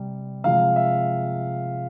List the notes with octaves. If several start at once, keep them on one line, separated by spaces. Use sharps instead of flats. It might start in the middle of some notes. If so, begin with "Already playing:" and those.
Already playing: C3 G3
C3 F3 G#3 F5
E5